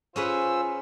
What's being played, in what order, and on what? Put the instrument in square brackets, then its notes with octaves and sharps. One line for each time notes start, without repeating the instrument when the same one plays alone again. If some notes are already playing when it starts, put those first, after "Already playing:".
[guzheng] C#4 G#4 B4 [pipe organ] F4 C5 E6